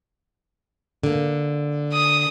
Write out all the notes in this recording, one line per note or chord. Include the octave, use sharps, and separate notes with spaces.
D3 A#3
D#6